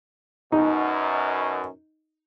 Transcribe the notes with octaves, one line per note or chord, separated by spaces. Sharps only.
F#2 B2 D#4